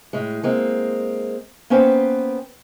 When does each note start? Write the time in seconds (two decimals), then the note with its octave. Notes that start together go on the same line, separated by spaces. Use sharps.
0.13 A2 G#3
0.43 G#3 A#3 C4
1.70 A#3 B3 C#4 B4 C5 G5